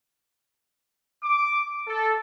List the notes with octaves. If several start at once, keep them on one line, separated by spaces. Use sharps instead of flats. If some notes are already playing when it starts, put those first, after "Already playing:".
D6
A4